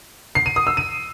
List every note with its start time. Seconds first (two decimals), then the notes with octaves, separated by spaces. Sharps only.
0.35 C7
0.46 D#7
0.56 D#6
0.67 E6
0.77 D#7